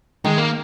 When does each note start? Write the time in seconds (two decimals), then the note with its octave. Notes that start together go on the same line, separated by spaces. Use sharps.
0.24 D#3 G#3
0.38 A#3